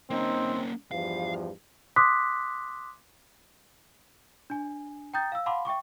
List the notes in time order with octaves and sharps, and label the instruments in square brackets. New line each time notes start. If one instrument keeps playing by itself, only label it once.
[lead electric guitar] A#3 C#4 [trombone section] C4 D#4
[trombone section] E2 G2 F3 [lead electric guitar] F5
[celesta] C6 D6 D#6 F#6 B6
D4 G#5
G5 A#5 D#6 G6 A6
F5 E6
F5 F#5 A5 B5 C6 D6
E5 G5 C#6 D6